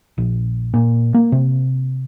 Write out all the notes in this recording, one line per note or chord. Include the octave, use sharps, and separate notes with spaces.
A#1
A#2
A#3
C3